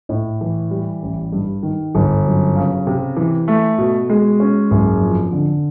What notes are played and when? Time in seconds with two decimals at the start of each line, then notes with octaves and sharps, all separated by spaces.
0.09 A2
0.41 E3
0.71 G3
1.02 A1
1.32 G2
1.63 D#3
1.95 G1
2.25 F#2
2.56 C#3
2.87 C3
3.17 E3
3.48 A3
3.78 B2
4.10 G#3
4.40 C#4
4.71 F#1
5.01 F2
5.33 D3